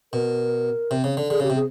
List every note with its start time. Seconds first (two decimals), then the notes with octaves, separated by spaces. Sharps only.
0.13 B2 A#4
0.91 C3
1.04 C#3
1.17 D3
1.30 D3 G#4
1.40 C#3
1.43 G4
1.50 C3
1.56 G#4